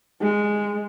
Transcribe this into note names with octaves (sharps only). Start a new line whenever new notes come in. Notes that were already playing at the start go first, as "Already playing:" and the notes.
G#3